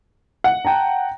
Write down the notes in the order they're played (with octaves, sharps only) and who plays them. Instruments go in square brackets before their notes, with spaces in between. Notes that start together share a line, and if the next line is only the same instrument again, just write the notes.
[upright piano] F#5
[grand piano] G5 A5 A#5